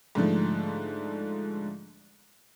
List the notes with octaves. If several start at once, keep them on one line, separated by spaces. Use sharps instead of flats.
G#2 D3 F3 A3